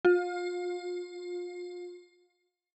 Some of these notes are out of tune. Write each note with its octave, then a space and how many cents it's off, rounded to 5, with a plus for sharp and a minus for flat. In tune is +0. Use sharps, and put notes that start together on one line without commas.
F4 +30